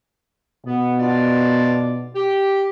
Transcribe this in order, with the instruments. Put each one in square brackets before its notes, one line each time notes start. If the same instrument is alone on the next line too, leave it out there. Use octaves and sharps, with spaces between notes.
[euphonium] B2 [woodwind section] B3
[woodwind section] D4 F4 D5
G4